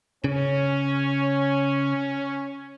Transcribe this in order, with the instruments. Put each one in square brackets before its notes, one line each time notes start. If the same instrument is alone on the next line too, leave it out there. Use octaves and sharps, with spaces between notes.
[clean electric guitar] C#3 [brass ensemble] C#4